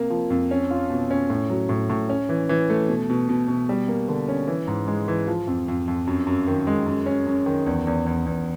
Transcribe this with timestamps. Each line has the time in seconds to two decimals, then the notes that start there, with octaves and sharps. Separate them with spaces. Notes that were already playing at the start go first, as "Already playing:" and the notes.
Already playing: C3 A#3
0.10 F3
0.30 F2
0.51 C#4
0.70 F4
0.90 B2
1.11 C#4
1.30 A2
1.50 F#3
1.69 A2
1.90 A2
2.09 C#4
2.29 E3
2.49 E3
2.70 A3
2.89 B2
3.10 B2
3.29 B2
3.48 B2
3.69 G3
3.88 A#3
4.09 D3
4.28 C#4
4.48 E3
4.68 G#2
4.88 G#3
5.08 E3
5.28 F3
5.47 F2
5.68 F2
5.88 F2
6.07 F#2
6.27 F#2
6.47 D#3
6.67 G#3
6.86 F#2
7.06 C#4
7.27 F#2
7.46 D#3
7.66 E2
7.87 E2
8.06 E2
8.26 E2